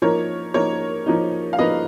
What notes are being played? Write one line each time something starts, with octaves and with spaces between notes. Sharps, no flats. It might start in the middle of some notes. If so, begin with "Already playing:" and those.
F3 A#3 D#4 A#4 C#5
F3 A#3 D#4 A#4 C#5
F3 A#3 D#4
F5
F3 A#3 D#4 B4 D#5